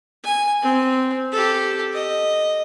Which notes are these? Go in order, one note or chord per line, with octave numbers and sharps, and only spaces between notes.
G#5
C4
G4 A4
D#5